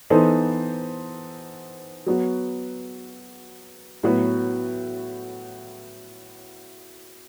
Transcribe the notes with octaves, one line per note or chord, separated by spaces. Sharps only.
E3 B3 D#4 A4 C5
F#3 B3 F#4
A2 F#3 B3 F#4 B4